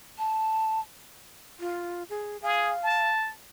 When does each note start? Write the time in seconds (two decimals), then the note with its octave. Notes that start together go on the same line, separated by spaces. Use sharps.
0.18 A5
1.60 F4
2.10 G#4
2.42 G#4 F5
2.83 A5